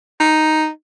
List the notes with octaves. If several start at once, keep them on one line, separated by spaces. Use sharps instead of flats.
D#4